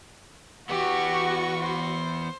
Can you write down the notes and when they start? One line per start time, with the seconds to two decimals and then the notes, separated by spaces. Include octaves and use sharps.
0.69 E3 B3 F#4 G4 C#6
1.60 C5